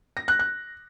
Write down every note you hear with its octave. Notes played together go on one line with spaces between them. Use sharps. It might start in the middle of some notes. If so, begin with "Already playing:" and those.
A#6
F#6
F#6